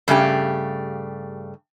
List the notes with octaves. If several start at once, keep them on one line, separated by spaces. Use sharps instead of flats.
G2 C#3 A3 G4